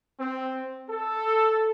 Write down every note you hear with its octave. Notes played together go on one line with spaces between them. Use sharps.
C4
A4